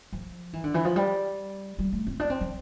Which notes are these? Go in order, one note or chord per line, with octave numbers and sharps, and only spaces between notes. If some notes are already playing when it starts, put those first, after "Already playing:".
F3
E3
D3
E3
F3
G3
G3
A3
C4
D4
C4
F3